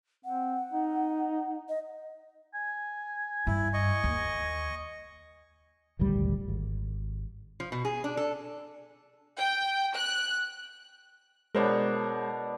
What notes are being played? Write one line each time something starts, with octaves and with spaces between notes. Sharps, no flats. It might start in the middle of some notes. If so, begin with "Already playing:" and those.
C4 F#5
D#4
D#5
G#5
G2 E4
D#5 C#6
D#2
D#1 G#1 D2 G3
G#1
F3
B2
G#4
D4
A4
G5
F#6
B2 G#3 B3 D4 A#4 C5 C#5